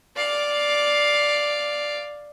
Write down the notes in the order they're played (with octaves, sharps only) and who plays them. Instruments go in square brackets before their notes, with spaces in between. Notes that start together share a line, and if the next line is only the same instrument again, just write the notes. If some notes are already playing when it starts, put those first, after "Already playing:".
[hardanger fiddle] D5 F5